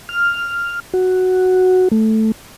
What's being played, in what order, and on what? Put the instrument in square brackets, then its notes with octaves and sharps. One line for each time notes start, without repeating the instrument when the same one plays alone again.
[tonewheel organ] F6
F#4
A3